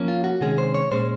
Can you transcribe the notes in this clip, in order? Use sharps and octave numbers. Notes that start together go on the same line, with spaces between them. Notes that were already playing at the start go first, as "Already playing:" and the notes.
Already playing: F3 A#3 C#4
F4
F#4
C3 D#3 G#3 C#4 G#4
C5
C#5
A#2 G#3 C#4 C5